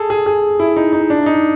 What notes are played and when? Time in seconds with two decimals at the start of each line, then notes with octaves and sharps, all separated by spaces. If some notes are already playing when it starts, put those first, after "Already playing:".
Already playing: G#4 A4
0.10 G#4
0.26 G#4
0.60 E4
0.77 D#4
0.93 D#4
1.10 D4
1.26 D#4